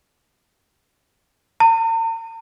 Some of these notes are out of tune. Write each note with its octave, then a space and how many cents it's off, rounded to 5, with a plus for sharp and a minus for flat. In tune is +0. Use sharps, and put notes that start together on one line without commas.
A#5 -45